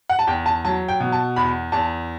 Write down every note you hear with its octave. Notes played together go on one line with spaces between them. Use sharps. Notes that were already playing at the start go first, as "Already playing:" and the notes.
F#5
A5
E2 G5
A5
F#3 A5
G5
B2
A5
E2 B5
E2 A5